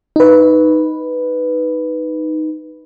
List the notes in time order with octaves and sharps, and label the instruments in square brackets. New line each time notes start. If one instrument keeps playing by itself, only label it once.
[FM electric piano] D#4 B4